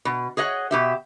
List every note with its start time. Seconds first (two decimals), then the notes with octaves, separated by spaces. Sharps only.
0.05 B2
0.37 G#4 C#5 D#5 F#5
0.71 B2 G4 E5